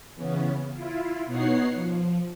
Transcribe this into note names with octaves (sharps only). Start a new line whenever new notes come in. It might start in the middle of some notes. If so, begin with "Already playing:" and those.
C#3 E3 B3 C#4
E4 F4
B2 B3 D#4 C#5 F#5 C7
F3